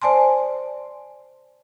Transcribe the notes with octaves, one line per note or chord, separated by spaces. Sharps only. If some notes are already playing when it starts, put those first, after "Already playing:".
C5 D5 G#5 A5 C6